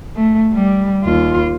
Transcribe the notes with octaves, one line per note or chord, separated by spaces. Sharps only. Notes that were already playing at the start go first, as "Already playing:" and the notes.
A3
G3
D#2 F4